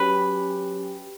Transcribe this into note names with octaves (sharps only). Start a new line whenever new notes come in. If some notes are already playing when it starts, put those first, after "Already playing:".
Already playing: F#3 C#4 G4 B4